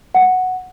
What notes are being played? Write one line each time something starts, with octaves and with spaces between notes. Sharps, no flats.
F#5